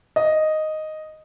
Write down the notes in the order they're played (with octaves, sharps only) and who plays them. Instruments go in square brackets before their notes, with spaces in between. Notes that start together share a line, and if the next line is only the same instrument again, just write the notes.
[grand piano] D#5